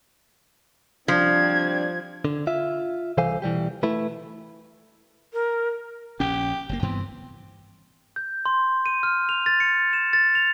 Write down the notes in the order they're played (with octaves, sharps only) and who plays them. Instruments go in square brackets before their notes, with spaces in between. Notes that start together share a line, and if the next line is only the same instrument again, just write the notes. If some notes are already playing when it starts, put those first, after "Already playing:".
[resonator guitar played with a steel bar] F3 [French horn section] G3 C4 D4 [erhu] G#6
[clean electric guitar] D3
F4 E5
C2 E3 A4 C5 F5 G#5
B2 E3 G3 G4
A3 E4 B4
[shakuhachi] A#4
[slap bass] A#1 C#3 C#4 [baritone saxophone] G4
[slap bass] F#1 G2 A#3
[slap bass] G2 E3 B3 [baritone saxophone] C4
[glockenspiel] G6
C6
D#7
F6
F7
A6
C#7
E7
A6
F7